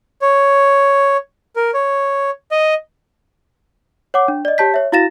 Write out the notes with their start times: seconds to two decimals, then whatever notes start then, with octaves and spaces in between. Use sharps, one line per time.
0.22 C#5
1.56 A#4
1.74 C#5
2.51 D#5
4.14 C#5 F#5 D6
4.28 D4
4.45 D5 D#5
4.58 G4 C#5 A5 G6 B6
4.74 C#5 E5
4.92 E4 F#4 F5 A6 A#6 E7